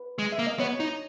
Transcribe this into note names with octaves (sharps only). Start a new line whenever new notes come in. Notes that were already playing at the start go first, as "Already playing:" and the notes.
Already playing: B4
G#3
E5
A#3
D#5
B3 C#5
D#4 D#5